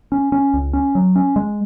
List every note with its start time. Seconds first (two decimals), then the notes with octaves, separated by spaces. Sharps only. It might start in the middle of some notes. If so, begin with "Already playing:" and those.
0.12 C#4
0.32 C#4
0.54 C#2
0.73 C#4
0.95 F#3
1.16 C#4
1.36 G#3